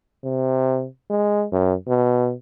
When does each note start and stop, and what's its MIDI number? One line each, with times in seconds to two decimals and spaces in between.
0.24 0.86 48
1.10 1.45 56
1.52 1.74 42
1.88 2.33 47